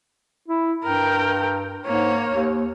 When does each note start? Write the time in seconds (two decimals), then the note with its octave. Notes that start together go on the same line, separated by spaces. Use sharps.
0.48 E4
0.84 G2 A#4 G5
1.86 G#2 A#3 C#5
2.33 D#2